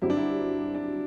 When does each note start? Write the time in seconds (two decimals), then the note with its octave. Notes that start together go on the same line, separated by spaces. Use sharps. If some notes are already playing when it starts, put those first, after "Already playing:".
0.02 G2 D3 F#3 C4 E4 G4
0.10 D4
0.17 E4
0.74 D4